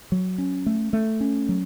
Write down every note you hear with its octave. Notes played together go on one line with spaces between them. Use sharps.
F#3
C#4
A3
A3
C#4
F#3